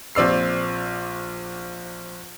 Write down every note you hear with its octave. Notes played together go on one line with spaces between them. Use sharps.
A#1 C4 D5 E6 C7